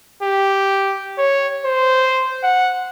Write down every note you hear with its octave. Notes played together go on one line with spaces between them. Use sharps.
G4
C#5
C5
F#5